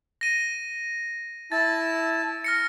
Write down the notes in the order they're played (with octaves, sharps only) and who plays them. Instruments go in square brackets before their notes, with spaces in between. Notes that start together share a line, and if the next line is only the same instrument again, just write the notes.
[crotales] A#6 D#7
[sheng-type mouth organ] E4 A5 [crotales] A6
[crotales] F6 A#6 C#7